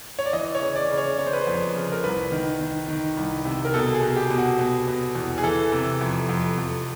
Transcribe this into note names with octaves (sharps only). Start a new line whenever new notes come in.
C#5
D5
E3 D#5
C#5
C#3
D5
C#3
C#5
C#3 C#5
C5
B4
C5
F2
C#3
A#4
C2 B4
D#3
D#3
D#3
C2
C3
A#4
B2 A4
G#4
B2
G4
B2
F#4
B2
B2
E2
G#4
E3 A4
C3
F2
F2
F2